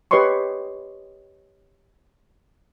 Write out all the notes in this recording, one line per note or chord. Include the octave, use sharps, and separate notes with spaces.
G4 B4 C#5 D#5 C6 C#6